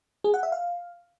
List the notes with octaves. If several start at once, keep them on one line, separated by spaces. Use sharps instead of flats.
G#4
F#5
E5
F5